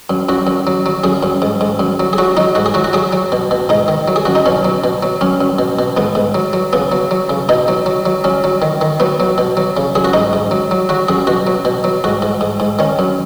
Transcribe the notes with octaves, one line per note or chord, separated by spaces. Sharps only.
F#2
F#2 F#4
F#2
F#3
F#3
F#2 G#4
F#2
G#2
G#2
F#2
F#3
G#4
F#3 F#4
F#3 D#4
G#2 F#4
G#4
F#3 F#4
F#4
F#3 G#4
F#3
B2
B2
G#2 D#4
D#3
F#3
G#4
F#2 F#4
D#4
B2 C#4
F#3
B2
F#3
F#2 C#4
F#2
B2
B2
G#2 B3
G#2
F#3
F#3
C#3 B3
F#3
F#3
C#3
B2 D#4
F#3
F#3
F#3
F#3 C#4
F#3
D#3
D#3
F#3 B3
F#3
B2
F#3
C#3
F#2 G#4
F#4
G#2 D#4
G#2
F#3
F#3
F#3 F#4
F#2 G#4
B2 F#4
F#3
B2
F#3
G#2 F#4
G#2
G#2
G#2
D#3 C#4
F#2